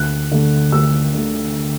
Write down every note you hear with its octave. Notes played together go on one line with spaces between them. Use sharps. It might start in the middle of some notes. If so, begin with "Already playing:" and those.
Already playing: D2 F#6
D3 A3
D2 E6
D3 A3